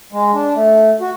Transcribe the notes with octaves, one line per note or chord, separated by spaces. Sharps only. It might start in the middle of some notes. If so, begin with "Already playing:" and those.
G#3
D4
A3
F#4